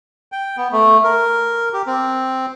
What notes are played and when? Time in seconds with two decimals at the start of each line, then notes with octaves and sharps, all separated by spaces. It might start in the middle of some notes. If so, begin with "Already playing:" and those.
0.32 G5
0.57 B3
0.72 A3
1.04 A#4
1.73 G4
1.87 C4